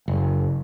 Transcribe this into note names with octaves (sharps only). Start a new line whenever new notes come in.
F#1